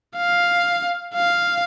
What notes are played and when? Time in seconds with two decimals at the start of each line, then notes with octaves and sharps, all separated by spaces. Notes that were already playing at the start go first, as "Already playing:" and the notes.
0.17 F5
1.15 F5